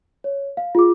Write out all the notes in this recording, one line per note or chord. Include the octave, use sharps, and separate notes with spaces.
C#5
F5
F4 G#4 D6